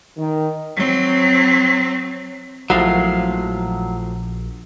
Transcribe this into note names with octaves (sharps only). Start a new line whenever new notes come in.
D#3
F#3 C4
A#1 A2 F3 F#3 F5